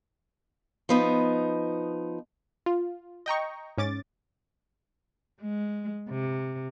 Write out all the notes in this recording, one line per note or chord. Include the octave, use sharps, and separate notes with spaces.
F3 B3 D#4
F4
D#5 G5 A#5 C#6
G#2 C#4 D6 A6
G#3
C3